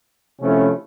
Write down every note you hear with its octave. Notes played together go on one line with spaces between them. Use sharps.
C3 F3 A3 C#4 E4